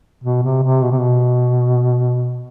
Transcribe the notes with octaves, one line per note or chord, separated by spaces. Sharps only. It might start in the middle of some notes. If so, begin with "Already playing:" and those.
B2
C3
C3
B2
C3
B2